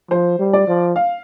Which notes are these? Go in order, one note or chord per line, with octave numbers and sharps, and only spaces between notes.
F3 C5
G3
D5
F3
F5